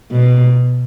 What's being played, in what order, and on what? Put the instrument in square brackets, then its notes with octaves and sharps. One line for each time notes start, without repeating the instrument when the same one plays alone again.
[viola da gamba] B2